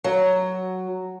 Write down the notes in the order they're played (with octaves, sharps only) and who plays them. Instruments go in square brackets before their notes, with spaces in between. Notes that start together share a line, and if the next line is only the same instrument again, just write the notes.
[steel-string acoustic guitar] F#3